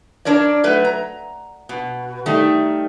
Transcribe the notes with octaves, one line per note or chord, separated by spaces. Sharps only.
D4 A#4 C#5 D5
F#3 A3 B4
A#5
B2
D#3 G3 A3